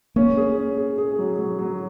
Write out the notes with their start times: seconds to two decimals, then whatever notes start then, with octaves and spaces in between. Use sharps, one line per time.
0.16 A#3 C#4
0.37 G#4
0.57 C#4
0.78 G#4
0.98 G#4
1.19 F#3
1.39 F#3
1.59 F#3